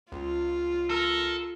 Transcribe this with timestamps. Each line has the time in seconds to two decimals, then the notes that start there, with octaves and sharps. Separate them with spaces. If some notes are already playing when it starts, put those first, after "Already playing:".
0.12 C#2 F4
0.90 A4 A#4